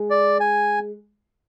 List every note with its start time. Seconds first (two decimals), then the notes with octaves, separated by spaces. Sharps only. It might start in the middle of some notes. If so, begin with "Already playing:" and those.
Already playing: G#3
0.10 D5
0.40 G#5